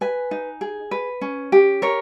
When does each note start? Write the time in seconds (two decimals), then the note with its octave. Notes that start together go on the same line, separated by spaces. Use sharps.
0.01 B4 G#5
0.31 D#4
0.61 G#4
0.91 B4
1.21 C#4
1.52 G4
1.82 A#4 C#5